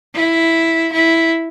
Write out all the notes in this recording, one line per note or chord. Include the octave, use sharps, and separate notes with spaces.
E4
E4